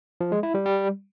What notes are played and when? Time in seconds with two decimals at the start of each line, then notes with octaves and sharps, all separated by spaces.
0.21 F3
0.32 G#3
0.43 E4
0.54 G3
0.66 G3